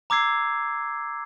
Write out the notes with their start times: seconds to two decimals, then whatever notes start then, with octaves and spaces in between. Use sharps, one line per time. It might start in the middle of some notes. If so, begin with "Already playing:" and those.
0.10 A#5 D6 E6 G#6 C7